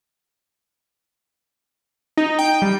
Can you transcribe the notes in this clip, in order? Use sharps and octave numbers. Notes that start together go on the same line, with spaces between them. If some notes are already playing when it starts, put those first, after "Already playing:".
D#4
G5
G3